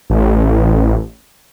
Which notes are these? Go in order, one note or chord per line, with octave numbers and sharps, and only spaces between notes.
A1